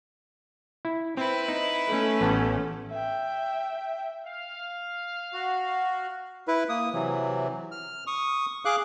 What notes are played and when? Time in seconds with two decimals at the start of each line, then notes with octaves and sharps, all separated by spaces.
0.85 E4
1.17 C4 E4 B4
1.48 D#4
1.87 A3 C#4
2.21 A1 B3 A5
2.90 E5 G5
4.26 F5
5.33 F#4
6.48 E4 B4
6.69 A#3 D#6
6.93 C3 E3 F#3
7.71 F6
8.07 C#6 D#6
8.65 G#4 F5 D6 F#6